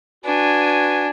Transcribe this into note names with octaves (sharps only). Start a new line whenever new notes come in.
D4 F#4 B4 G#5